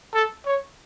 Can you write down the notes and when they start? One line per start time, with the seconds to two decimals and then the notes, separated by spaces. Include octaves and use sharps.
0.14 A4
0.46 C#5